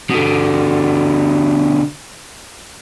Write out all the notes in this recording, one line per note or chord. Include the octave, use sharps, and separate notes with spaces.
B2 D3